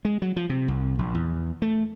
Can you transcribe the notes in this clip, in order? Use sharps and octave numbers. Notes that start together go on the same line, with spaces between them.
G#3
F#3
F3
C3
C2
A#1
E2
A3